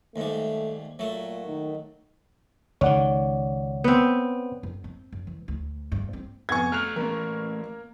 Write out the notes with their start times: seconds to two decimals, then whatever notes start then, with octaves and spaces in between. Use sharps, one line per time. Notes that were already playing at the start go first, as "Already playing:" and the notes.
0.16 D#2 G#2 G3 A3
0.99 A#2 F#3 A3
1.47 D#3
2.81 C#2 D#3 C#5 D5 F#5
3.84 B3 C4
4.63 F#2
4.84 C4
5.12 F#2
5.27 E3
5.48 D2
5.92 G2
6.13 C4
6.49 F1 B3 G#5 C#6 G#6
6.72 A3 A#5 F6 F#6 F7
6.96 E3 A3 A#3 A#4